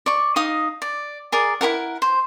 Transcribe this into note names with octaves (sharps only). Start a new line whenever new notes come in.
D5 C#6
D#4 D#5 F5 D#6
D5
G#4 A#4 D5
E4 G#4 A#4 F#5
C5